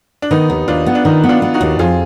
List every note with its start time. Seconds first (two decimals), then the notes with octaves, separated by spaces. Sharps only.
0.22 D4
0.31 D#3 B3 D#4
0.50 D#2
0.68 D#2 D4 F4
0.86 B3
0.95 D4
1.04 D#3 B3 D#4
1.24 B3
1.29 D4 F4
1.42 B3
1.54 D#4 F#4
1.61 D#2
1.79 F2 F4 G#4